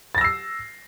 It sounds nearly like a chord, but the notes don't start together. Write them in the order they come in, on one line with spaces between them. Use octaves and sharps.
A6 A#6 E6 C7